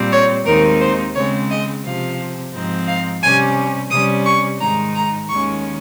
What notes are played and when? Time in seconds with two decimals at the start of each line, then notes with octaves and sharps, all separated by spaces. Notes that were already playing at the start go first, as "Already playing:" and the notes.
Already playing: A#2 G3 C4
0.11 C#5
0.45 D#2 D#3 G#3 C4 D#4 A#4
0.79 C5
1.14 C#3 G#3 C4 C#5
1.49 D#5
1.83 C3 F3 C4 F5
2.52 G#2 F3 C4 D#4
2.86 F5
3.22 C3 G3 C#4 G#5
3.90 C3 G3 C#4 D#6
4.25 C#6
4.59 G#2 D#3 G#3 D#4 A#5
4.94 A#5
5.28 D#2 D#3 G#3 C#4 C#6